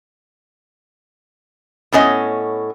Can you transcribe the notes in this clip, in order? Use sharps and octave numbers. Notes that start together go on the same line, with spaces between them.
A2 B3 C#4 D#5